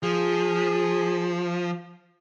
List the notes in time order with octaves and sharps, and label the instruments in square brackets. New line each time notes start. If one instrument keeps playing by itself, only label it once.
[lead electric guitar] F3 [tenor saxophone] G#4